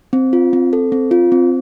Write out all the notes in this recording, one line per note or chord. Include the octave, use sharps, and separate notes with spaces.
C4
F4
C4
A4
C4
F4
C4